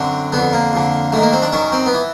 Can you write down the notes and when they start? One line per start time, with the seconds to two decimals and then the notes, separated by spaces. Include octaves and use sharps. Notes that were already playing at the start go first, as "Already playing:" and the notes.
Already playing: F#2 D3 C4
0.33 F2 D3 B3
0.53 A#3
0.73 F2 D3
1.12 F#2 D#3 A3
1.22 A#3
1.33 C4
1.42 D4
1.52 F#2 D#3 C#4
1.72 C4
1.86 B3
1.93 E3